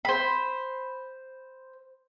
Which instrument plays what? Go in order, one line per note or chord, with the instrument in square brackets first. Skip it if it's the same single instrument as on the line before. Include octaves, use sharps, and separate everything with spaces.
[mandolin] C5 B5